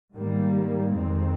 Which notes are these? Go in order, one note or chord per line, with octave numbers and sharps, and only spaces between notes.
G#2 D#3 G3 A#3
F2 D#3 G#3 C4